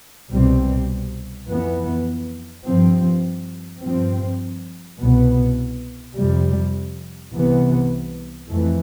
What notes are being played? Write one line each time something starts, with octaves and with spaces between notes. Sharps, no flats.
C2 B2 G3 C4
F2 E3 B3
G2 F3 C4
G2 F3 C4
C2 B2 B3
F2 C3 G3
C2 C3 E3 B3
F2 E3 A3